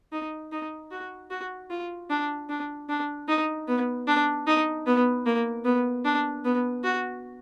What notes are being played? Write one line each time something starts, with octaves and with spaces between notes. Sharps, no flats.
D#4
D#4
F#4
F#4
F4
D4
D4
D4
D#4
B3
D4
D#4
B3
A#3
B3
D4
B3
F#4